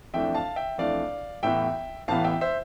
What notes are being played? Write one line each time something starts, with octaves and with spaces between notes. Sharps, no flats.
F2 E3 A3 D4 E5 G5
F5 A5
E5 G5
F2 E3 A3 D4 D5 F5
A1 A2 E3 B3 E5 G5
A1 A2 E3 B3 F5 A5
E5 G5
C5 E5